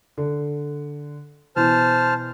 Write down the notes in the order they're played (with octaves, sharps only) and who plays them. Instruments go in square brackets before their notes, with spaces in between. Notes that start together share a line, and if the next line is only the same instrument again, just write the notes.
[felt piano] D3
[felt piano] B2 E3 [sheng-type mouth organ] C5 A5 F6